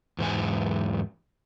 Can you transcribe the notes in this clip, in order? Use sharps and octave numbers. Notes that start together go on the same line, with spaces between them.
E2 G#2 G#5